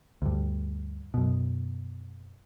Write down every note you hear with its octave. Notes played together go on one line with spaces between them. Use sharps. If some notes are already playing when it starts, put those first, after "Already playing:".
D2 G2
F#2 B2